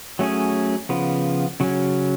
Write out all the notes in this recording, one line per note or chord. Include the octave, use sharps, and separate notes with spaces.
F#3 A3 C#4 G#4
C#3 F3 B3
C#3 F#3 C#4